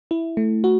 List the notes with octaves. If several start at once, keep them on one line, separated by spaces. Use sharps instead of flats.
E4
A3
F#4